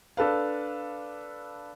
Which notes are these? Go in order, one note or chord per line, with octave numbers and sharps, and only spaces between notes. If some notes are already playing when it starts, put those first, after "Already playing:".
D4 A4 B4 F5